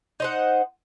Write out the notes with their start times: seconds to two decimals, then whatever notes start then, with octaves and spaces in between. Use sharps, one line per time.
0.20 D#4 C5 F#5